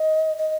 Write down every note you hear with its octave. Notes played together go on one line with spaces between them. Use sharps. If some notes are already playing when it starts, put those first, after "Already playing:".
Already playing: D#5
D#5